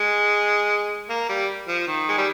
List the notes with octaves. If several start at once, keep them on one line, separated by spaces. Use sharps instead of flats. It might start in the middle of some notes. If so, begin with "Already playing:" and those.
Already playing: G#3
A#3
G3
F3
D#3
G#3
G3